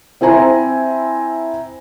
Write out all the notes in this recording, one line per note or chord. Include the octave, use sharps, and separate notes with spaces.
C4 E4 C5 G#5 A#5